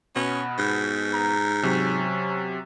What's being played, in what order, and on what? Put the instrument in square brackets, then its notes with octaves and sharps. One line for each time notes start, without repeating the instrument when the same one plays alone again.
[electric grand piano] B2 [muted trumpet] B3 [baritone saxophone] C#4
[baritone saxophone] G#2
[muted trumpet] A#5
[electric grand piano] C3 F#3 [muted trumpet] C#4